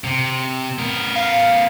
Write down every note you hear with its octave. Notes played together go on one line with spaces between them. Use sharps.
C3
B3 A#4
F5